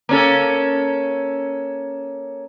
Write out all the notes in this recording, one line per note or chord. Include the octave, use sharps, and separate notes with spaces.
A#3 C#4 A4